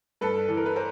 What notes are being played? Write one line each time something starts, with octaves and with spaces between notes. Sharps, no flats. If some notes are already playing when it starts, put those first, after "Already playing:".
G2 A4 B4
E3 A4
A#4
B4
A#4 C5